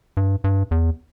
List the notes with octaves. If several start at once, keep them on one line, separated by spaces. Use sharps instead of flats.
G2
G2
E2